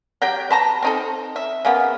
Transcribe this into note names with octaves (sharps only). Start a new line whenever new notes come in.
F#3 G4 G5
B4 A5 A#5
C4 D#4 A4
E5
C#3 A#3 B3